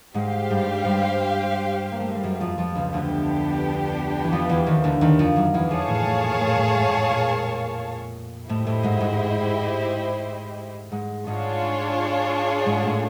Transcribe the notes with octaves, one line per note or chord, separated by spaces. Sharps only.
G#2 G#3 G4 C5 F5
G2 G3
G2 G3
A#3
A3
G#3
G3
F#2 F#3
F2 F3
F2 F3
C#2 C#3
D2 D3 B3 D4 G4
E3
F2 F3
E2 E3
D#2 D#3
D2 D3
D#2 D#3
F2 F3
F#2 F#3
E2 E3
F2 F3 G#4 C#5 F5 A5
A2 A3
A2 A3
A#2 A#3
A2 A3
A2 A3
G#2 G#3
A2 A3
A#2 A#3
A2 A3 E4 G4 C5 D#5
A2 A3
G#2 G#3
G#2 G#3
G#2 G#3
G#2 G#3 D4 F4 G#4 C#5
G#2 G#3
A2 A3